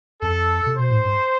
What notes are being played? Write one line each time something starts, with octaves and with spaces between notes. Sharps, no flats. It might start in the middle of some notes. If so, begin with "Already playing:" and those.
F2 A4
C3
B2 C5
A2
G2